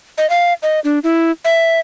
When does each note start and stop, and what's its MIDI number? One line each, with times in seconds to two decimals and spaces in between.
0.18 0.29 75
0.30 0.53 77
0.63 0.80 75
0.84 0.99 62
1.04 1.31 64
1.45 1.80 76